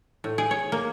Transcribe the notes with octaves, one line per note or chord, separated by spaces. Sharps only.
A2
G#4
C#5
A#3